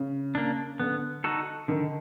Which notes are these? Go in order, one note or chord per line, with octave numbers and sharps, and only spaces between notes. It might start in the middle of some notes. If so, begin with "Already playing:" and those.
Already playing: C#3
A#3 D4
D3 B3
D#4 F#4 A4
D3 D#3